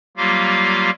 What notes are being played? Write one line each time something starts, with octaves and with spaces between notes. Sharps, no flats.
F#3 G3 A#3 F4 G4 F5